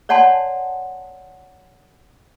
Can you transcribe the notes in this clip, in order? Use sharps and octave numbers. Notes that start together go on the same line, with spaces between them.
C#5 D5 F#5 G#5 A5 C6